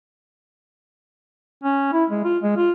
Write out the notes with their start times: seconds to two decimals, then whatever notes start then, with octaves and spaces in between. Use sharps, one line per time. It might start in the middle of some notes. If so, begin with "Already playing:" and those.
1.64 C#4
1.93 E4
2.10 G#3
2.25 F4
2.43 G#3
2.57 F4